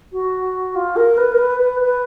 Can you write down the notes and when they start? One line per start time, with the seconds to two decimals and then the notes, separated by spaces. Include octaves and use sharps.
0.12 F#4
0.75 F4
0.96 A#4
1.17 B4
1.32 A#4
1.38 B4
1.59 B4
1.80 B4